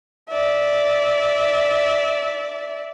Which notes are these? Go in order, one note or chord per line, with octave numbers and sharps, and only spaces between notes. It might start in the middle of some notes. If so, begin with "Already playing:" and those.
D5 E5